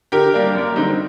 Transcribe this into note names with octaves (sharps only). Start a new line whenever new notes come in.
D3 G4 A#4
G3 A#3 D4
F#2
D3 G3 C4 D#4